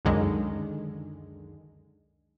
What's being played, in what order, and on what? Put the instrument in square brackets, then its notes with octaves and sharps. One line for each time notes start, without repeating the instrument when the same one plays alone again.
[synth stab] C#2 F#2 D3 D#3 G#3